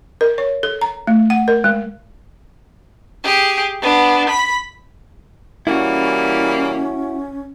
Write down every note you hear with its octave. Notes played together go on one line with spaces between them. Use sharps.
A#4
C#5
A4
A#5
A3
F#5
A#4
G#3
G4 G#4
B3 D4
B5 B6
E3 G3 A#3 C#4 E4 F#4